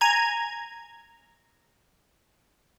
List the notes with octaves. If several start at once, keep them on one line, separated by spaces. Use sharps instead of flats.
G#5 A#5 G#6